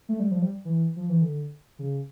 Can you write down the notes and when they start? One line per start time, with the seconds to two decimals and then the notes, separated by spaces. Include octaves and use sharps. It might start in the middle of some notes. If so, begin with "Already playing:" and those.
0.09 A3
0.20 G3
0.31 F3
0.42 G3
0.65 E3
0.96 F3
1.09 E3
1.22 D3
1.79 C#3